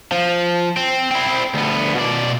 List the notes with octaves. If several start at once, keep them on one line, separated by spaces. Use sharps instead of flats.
F3
C4
C4 E4
D2 B3
B2 D5